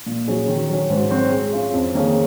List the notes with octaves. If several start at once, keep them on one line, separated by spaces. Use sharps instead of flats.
A#2
F#3 C#4 G#4
D#3
F#3 C#4
G#2
F#3 C4 F#4 C#5
G#3
C#4 F4
F2
D#3 A#3 C#4 G#4